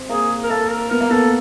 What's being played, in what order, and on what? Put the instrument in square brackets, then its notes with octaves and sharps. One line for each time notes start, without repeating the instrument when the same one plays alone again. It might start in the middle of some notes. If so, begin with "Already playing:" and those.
Already playing: [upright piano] C4
[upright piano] A#3 [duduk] G#4
[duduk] A#4
[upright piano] A#3 [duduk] A4
[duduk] A#4
[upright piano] B3 [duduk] A#4
[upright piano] A#3
[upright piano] B3 [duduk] A4